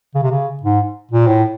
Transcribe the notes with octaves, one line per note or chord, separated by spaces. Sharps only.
C#3
C3
C#3
G#2
A#2
A2